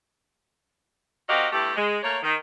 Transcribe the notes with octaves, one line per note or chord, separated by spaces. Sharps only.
C4 F#4 G4 A#4 D#5 F5
G2 A3 E4 G4
G#3
A3 A#3 A#4 C#5
D#3